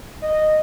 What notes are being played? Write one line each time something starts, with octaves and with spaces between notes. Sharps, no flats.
D#5